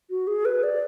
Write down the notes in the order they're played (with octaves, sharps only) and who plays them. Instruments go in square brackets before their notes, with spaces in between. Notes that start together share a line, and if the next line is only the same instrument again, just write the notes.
[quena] F#4
G#4
B4
D5